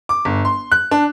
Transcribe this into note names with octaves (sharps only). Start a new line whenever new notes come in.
D6
G1
C6
F#6
D4